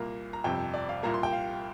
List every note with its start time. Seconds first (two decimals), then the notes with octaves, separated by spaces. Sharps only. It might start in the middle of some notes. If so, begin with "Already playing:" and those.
Already playing: C2 A#2 A#3 A#5
0.33 A#5
0.44 G1 F2 C3 G5
0.74 D5
0.89 F5
1.03 C2 A#2 A#3 A#5
1.14 C6
1.23 G5
1.33 F5